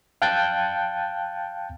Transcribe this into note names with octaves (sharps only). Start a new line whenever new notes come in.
F5 G5 A5 F#6 G6 A6